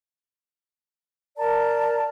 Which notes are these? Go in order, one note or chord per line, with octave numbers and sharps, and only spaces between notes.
A#4 D5 A5 A#5